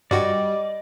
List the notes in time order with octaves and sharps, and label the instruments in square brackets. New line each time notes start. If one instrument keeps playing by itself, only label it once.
[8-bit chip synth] G2 F#4 [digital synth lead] G3 [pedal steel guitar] D5 [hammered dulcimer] D#5 G5 D6